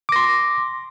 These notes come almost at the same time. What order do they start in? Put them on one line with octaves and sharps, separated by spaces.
D6 A#6 C6